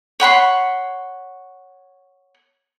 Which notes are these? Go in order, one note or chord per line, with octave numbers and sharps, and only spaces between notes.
C#5 F#5 B5 C6